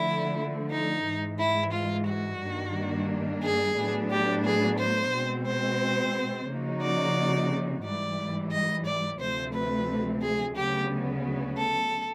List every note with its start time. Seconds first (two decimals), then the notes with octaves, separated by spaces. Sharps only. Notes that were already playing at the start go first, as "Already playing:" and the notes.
Already playing: D3 F3 A3 E4
0.71 D#4
1.06 G#2 E3 G#3
1.39 E4
1.73 F4
2.07 F#4
2.41 G2 D#3 G3 A#3 D4
3.43 G#4
3.77 A2 F#3 B3 D4
4.11 G4
4.45 G#4
4.79 C5
5.12 B2 G#3 C4
5.47 C5
6.48 C#3 F3 A#3 D#4 F#4
6.82 D5
7.84 G#2 E3 G3 D5
8.52 D#5
8.86 D5
9.20 D2 C3 F3 A3 C4 C5
9.54 B4
10.22 G#4
10.56 D2 C#3 F#3 B3 G4
11.57 A4